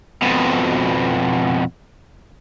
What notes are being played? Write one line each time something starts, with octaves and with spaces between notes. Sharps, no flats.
F2 B2